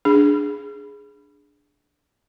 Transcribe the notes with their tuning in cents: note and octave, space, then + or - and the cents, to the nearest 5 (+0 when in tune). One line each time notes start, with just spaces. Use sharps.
D4 +0 G#4 +0